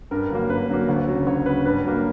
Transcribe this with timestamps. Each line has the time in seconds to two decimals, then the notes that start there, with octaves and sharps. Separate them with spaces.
0.11 G2 A#4
0.30 D3 F#3 A#3 A#4
0.50 G2 B4
0.69 D3 F#3 A#3
0.88 D2
1.08 C#3 F#3
1.27 D2 C#5
1.46 C#3 F#3 B4
1.65 G2 B4
1.84 F#3 A#3